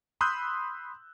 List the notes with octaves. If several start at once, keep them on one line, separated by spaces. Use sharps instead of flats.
B5 C6 D#6 E6 F#6 G6